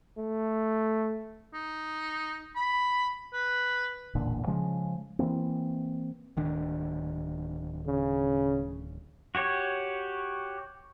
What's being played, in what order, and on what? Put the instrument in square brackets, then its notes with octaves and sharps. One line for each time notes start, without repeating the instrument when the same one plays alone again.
[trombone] A3
[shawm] D#4
B5
B4
[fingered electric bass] E1 A1 A#2 D3
C#3 F3 G#3
E3 F3 A#3 C4
[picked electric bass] D1 D#3 D4
[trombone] C#3
[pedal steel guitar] F#4 G4 C#5